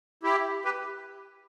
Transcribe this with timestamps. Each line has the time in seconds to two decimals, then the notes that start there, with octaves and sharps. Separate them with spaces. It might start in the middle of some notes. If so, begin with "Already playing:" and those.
0.23 E4 G4
0.65 G4 B4